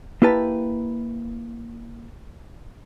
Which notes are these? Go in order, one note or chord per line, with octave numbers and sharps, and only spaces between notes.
A#3 E4 G4 B4 A5